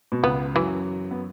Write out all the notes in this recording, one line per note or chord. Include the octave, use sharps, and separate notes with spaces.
B2
C#2 C#3 B3
F#2 E3 F#3
B3